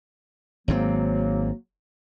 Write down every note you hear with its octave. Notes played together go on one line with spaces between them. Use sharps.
G#1 G#2 F#3 A#3 C4